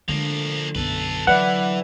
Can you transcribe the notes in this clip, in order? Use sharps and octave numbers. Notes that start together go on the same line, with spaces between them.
D3 F3 G#3 A#3
B1 F#2 A4 B4
E3 F#3 B4 D5 E5 F#5